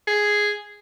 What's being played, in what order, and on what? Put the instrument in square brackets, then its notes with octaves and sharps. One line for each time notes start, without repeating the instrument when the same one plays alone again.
[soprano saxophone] G#4